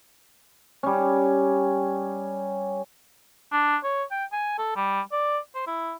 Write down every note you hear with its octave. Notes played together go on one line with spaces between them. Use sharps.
G3 C#4
D4
C#5
G5
G#5
A4
G3
D5
C5
E4